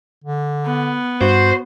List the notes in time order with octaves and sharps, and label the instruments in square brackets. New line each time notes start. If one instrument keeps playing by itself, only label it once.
[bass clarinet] D3
[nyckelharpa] B3
[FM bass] G2 [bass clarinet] F#4 [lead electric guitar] C5